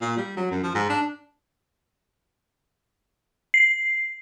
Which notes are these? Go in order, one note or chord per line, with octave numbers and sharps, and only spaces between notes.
A#2
G3
F#3
F#2
F3
G#2
D4
C7